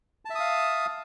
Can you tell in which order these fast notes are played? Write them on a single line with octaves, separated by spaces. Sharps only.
A5 E5 D#6 F5